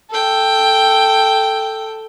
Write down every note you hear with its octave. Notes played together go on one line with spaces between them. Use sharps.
A4 G5